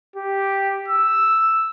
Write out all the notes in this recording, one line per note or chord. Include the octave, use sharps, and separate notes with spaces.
G4
E6